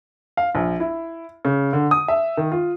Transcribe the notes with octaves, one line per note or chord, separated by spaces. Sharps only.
F5
A#1
E4
C#3
D3
D#6
E5
D#3
F4